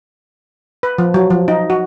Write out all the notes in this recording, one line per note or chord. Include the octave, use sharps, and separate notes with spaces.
B4
F3
F#3
F3
D#4
F#4